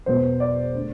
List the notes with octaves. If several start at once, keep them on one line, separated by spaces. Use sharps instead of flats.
E2 B2 F#3 B3 C5
D5
D3 A3